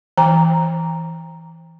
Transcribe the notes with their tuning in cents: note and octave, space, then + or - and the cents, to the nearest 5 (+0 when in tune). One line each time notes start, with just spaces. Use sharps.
E3 +0 G5 +35 A#5 +0